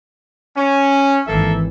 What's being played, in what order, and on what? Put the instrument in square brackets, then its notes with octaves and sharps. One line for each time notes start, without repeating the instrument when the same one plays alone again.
[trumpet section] C#4
[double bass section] G#1 E3 [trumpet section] A#3 A4 E5